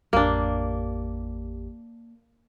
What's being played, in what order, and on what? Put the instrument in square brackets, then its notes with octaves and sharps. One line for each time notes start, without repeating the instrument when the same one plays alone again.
[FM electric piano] A1 F2 G4 [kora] A#3 D4